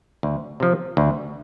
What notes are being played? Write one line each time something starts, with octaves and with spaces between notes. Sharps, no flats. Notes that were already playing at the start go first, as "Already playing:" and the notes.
D2
C3 F3
D2